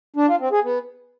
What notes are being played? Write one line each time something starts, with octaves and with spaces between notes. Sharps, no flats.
D4
F4
C4
G#4
B3